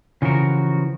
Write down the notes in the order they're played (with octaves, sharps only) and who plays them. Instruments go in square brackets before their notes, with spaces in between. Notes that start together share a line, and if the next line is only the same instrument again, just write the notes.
[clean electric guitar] C#3 E3 F3 F#4 A#4